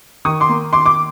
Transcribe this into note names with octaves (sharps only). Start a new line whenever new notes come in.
D#3 C#6 D#6
C6 D6
A#3
D#3 C6 D6
D6